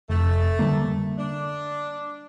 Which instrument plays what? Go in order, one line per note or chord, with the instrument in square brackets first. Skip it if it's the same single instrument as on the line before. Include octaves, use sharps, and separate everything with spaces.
[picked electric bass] F1 [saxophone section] A3
[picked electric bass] D3 G3 A#3
[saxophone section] D4